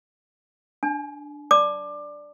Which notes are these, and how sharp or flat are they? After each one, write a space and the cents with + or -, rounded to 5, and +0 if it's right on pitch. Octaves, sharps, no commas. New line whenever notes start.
D4 +0 G#5 +40
D5 +0 A5 +0 D6 +20